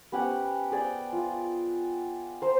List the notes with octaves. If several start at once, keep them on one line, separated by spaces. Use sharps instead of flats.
B3 C#4 G4 F#5
G#4 D5 G5
F4
C5 A#5